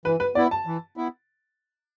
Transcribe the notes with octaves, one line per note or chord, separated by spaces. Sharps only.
E3 B4
B4
B3 E4 D5
A5
E3
B3 E4